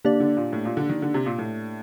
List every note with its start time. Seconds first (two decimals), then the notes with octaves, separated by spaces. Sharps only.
0.05 D3 A#3 D4 G4 D5
0.20 D3
0.37 A#2
0.53 A2
0.65 A#2
0.77 D3
0.89 D#3
1.02 D3
1.14 C3
1.26 A#2
1.39 A2